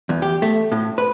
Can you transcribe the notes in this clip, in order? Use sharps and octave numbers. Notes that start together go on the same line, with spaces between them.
E2
G4
A3
A2
B4